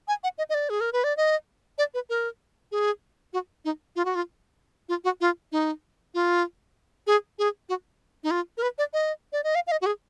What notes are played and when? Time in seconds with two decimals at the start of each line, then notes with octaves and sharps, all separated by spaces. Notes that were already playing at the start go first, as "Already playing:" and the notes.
0.08 G#5
0.24 F#5
0.38 D#5
0.50 D#5
0.54 D5
0.70 G#4
0.81 A#4
0.93 B4
1.04 D5
1.17 D#5
1.78 D5
1.94 B4
2.10 A#4
2.72 G#4
3.33 F#4
3.65 D#4
3.96 F4
4.05 F#4
4.15 F4
4.89 F4
5.04 F#4
5.21 F4
5.52 D#4
6.14 F4
7.07 G#4
7.39 G#4
7.69 F#4
8.24 D#4
8.31 F4
8.57 A#4
8.62 B4
8.78 D5
8.93 D#5
9.33 D5
9.44 D#5
9.55 F5
9.67 F5
9.72 D#5
9.81 F#4
9.86 G#4